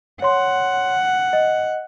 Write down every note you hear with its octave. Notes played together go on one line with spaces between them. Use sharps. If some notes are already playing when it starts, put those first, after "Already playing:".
C#5 F#5 C6
D#5